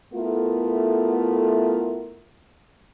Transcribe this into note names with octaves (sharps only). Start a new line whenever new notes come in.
A3 B3 E4 F4 A4 A#4